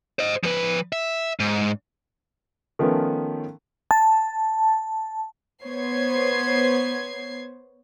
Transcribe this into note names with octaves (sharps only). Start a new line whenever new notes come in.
C5 D#5
F3 B4
E5
G#2
D#3 F3 A3 B3 C#4
A5
B3 C5 C#5 G#6 C7